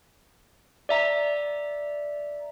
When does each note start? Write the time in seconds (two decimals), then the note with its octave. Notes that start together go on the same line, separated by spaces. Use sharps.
0.89 D5 E5 A#5